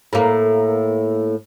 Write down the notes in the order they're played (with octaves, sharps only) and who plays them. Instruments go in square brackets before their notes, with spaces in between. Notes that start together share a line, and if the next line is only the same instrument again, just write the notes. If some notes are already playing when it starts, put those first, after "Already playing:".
[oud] A2 A#3